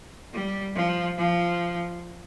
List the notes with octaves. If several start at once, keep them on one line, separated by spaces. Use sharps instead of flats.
G3
F3
F3